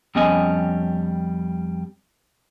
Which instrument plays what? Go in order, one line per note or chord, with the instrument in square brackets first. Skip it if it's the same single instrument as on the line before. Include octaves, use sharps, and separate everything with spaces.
[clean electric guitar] F2 G3 B3 C#4 D#5 G#5